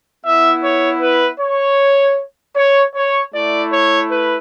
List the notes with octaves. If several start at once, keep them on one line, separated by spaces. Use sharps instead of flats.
B3 E4 E5
C#5
B4
C#5
C#5
C#5
A3 E4 D5
C#5
B4